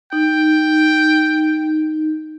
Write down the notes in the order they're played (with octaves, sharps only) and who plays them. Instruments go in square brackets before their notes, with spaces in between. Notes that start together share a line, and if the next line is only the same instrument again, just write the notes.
[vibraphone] D#4 [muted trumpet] G5